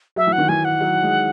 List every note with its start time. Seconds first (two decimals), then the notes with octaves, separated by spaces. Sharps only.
0.16 F#3 E5
0.27 E3
0.33 F#5
0.38 D#3
0.49 E3 G#5
0.65 F#5
0.81 F#3
1.03 G#3